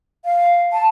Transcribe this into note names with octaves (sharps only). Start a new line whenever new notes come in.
F5
A5